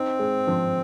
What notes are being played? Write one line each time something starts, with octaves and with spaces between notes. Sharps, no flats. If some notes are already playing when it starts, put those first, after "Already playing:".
Already playing: C4 D#4
G#3
F3